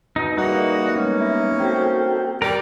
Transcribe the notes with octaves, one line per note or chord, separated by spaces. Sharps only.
B2 D#4
E3 G3 A#3 D#4 F#4 G#4 D5
G3 G#3 B3 C#4
E4
C4 F#4 A4 G5
G3 A#4 D5 G5